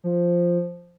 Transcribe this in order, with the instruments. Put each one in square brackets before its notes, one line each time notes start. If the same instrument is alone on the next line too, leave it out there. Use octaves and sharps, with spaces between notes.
[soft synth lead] F3